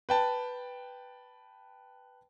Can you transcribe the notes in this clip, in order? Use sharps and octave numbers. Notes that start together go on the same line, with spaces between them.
B4 G5 A5